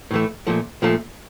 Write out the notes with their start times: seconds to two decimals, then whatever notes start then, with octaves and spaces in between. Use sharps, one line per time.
0.11 A2 E3 A3
0.47 A#2 F3 A3
0.82 A#2 F3 A3